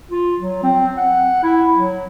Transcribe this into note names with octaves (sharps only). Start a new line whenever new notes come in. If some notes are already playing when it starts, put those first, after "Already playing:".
F4
F#3
C4
F#5
E4
F#3